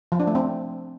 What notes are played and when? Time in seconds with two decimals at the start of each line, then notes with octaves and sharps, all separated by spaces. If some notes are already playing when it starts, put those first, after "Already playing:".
0.12 F3
0.20 D4
0.27 A3
0.35 C4